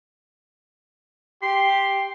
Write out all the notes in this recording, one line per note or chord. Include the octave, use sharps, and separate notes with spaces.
G4 C6